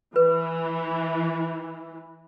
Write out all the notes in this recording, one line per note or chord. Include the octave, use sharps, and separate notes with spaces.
E3 B4